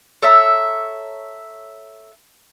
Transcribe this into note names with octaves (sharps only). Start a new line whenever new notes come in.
A4 C#5 E5 A#5